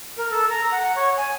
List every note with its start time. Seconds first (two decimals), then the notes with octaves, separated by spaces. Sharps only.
0.17 A#4
0.31 A4
0.49 A#5
0.71 F#5
0.96 C#5
1.17 G#5